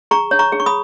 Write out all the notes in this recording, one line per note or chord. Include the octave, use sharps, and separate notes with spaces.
G#4 A#5 C#6
C#5
A#5 C#6
G#4
C#6
B5 D#6